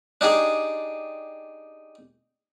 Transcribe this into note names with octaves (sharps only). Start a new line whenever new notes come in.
D4 D#4 G4 G#4